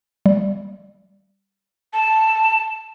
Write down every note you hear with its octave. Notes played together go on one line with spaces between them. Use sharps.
G3
A5